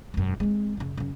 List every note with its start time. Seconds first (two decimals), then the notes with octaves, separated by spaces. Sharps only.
0.14 E1 F#2
0.40 G#3 C4
0.77 F#2 C#3
0.98 F#2 C#3